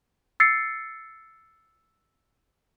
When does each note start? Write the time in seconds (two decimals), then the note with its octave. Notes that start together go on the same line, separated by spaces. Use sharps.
0.40 E6 A6 C7 C#7